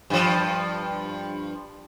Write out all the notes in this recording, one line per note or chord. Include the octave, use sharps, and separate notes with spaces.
G2 F3